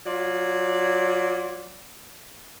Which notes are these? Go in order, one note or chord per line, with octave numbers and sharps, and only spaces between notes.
F#3 F4 D5